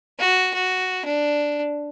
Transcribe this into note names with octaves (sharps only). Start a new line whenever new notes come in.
F#4
F#4
D4